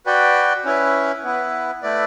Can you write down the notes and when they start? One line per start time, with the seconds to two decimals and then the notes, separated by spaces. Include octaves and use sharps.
0.06 F#4 B4 D5 G5
0.65 C#4 E4 B4
1.24 B3 E4 B4
1.82 A3 E4 B4 D5